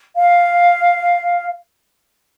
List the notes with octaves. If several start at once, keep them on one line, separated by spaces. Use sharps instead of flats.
F5